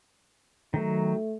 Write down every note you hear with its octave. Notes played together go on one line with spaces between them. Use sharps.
D#3 F#3 A3